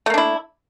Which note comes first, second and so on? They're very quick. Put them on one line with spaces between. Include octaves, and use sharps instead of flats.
A3 A#3 D4 E4